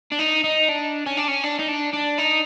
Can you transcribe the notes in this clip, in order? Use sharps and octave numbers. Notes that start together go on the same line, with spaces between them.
D4
D#4
D#4
D4
C#4
D4
C#4
D4
D#4
D4
D4
D#4